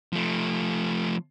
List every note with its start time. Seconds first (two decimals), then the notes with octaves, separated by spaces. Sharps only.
0.13 F3 A3